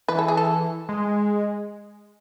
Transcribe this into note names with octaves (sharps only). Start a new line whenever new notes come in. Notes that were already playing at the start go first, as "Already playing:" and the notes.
E3 B4
A4
G#4
A4
G#3